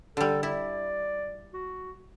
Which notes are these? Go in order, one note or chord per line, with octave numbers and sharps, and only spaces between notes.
D3 G3 A4
E4 D5
F#4